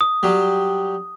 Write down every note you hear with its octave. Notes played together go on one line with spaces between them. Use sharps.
D#6
F#3 G3